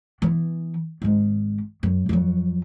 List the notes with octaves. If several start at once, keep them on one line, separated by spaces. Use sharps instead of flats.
E3 B3
G#1 G#3
F#2
F2 F#3